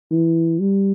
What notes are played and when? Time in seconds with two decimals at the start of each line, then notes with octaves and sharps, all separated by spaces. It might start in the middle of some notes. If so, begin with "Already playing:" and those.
0.11 E3
0.59 G3